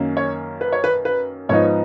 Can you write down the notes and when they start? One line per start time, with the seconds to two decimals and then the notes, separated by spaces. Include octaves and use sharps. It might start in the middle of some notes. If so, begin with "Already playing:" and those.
Already playing: F#2 D#3 A#3 C#4
0.17 C#5
0.61 B4
0.72 C#5
0.84 B4
1.05 B4
1.49 G#2 F3 B3 D#4 C#5